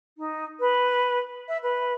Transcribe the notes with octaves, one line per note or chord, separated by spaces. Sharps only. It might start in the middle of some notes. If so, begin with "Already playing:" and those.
D#4
B4
E5
B4